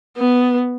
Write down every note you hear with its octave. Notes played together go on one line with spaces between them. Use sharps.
B3